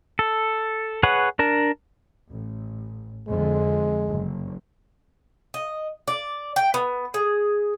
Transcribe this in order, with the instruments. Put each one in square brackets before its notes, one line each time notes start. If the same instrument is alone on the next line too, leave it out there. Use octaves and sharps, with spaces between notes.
[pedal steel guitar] A4
G#4 B4 C#5 F#5
D4 A#4 A5
[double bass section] A1
[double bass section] F2 D3 [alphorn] G#3
[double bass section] F#1
[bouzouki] D#5
D5
G5
B3
G#4